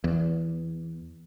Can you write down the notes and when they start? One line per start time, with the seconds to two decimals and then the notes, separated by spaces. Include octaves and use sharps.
0.04 E2